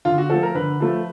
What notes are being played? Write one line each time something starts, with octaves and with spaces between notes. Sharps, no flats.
D3 F4
F#4
F3 A3 A4
A#4
D3 B4
F3 A3